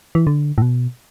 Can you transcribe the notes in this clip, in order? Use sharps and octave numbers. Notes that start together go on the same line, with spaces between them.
E3
D3
A2
B2